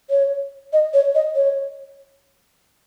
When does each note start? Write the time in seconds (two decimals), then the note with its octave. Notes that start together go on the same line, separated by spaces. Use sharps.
0.10 C#5
0.73 D#5
0.94 C#5
1.15 D#5
1.35 C#5